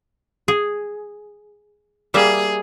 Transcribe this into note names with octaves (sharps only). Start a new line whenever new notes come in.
G#4
G3 A#3 G#4 E5